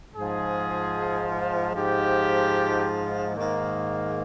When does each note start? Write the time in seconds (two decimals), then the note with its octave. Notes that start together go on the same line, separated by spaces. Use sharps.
0.14 G#2 F3 G#4
1.74 G#2 F3 G4
3.34 G#2 D#3 A#3